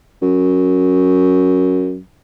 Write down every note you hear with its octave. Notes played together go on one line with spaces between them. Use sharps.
F#2